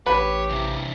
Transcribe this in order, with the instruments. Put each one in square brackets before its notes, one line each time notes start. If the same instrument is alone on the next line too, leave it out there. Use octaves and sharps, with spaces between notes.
[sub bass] A1 [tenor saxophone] G4 [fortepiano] B4 [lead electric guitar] C#5
[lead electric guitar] C3 E3